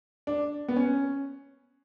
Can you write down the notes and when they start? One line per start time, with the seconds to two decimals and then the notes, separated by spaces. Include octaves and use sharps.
0.27 D4
0.68 B3
0.76 C#4